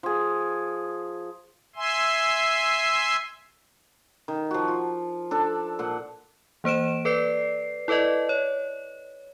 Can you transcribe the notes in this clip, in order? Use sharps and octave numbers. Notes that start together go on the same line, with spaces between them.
F3 G#4
E5 G#5 C6
D#3
F3 F#4
F4
D4 A4
A#2 F#5
E3 A#3 C5 D7 E7
A4 B4 D5 C7
E4 A4 B4 D5 D#5
C#5